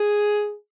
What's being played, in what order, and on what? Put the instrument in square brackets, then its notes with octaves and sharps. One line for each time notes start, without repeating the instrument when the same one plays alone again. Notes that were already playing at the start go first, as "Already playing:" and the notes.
Already playing: [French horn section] G#4